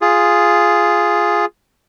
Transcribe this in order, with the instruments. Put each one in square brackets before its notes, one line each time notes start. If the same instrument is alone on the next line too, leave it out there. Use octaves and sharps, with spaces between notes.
[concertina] F4 G#4